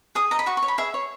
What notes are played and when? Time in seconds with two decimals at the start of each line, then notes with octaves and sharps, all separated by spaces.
0.15 G#4 D#6
0.31 D#5 A#5
0.39 B5
0.46 F#4 C#6
0.57 C#6
0.63 C#5
0.68 B5
0.78 G#4 E5
0.94 C#5